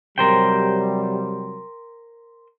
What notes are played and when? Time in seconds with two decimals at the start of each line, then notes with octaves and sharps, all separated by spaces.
0.18 C3 F#3 G3 A#4 C5 G5